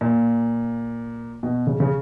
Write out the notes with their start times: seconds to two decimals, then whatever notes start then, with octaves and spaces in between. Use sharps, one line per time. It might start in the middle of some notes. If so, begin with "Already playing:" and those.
0.01 A#2
1.43 B2
1.67 C#3
1.80 C#3